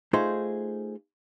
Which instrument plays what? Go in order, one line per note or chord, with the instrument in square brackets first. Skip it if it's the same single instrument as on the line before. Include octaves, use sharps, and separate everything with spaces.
[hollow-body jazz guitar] A3 D#4 F4 G#4 C5